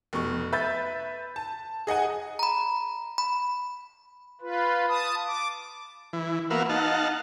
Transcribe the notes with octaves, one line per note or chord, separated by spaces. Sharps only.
F1 B2 C#6
B4 E5 B5 G6 A6
A5
G#4 D#5 F#5 G#5
A#5 B5
B5
F4 B4
A5 D#6
D6
E3
A#3 B3 F#4 E5 F5
D#4 F5 F#5 A5